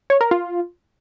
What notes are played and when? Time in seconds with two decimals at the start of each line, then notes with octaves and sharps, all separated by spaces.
0.10 C#5
0.21 A#4
0.31 F4